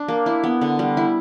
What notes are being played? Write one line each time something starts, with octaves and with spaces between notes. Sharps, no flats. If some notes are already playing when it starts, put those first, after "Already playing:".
Already playing: D4
A#3
E4
B3
D3
G3
E4